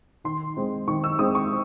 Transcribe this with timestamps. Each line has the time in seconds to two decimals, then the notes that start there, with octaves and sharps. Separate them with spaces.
0.24 D#3 C6
0.57 G#3 C4
0.88 D#3 C#6
1.04 E6
1.19 G#3 C4 D#6
1.35 C#6